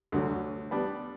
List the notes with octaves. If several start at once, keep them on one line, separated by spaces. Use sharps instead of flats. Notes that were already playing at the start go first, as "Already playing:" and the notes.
D2 D3 F#3
G3 B3 D4